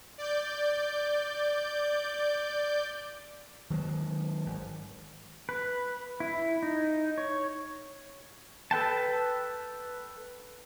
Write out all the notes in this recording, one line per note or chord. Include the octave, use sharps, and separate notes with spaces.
D5 G6
D#3 F#3 G#3
G#1
B4
E4
D#4
C#5
A4 B4 G5 A5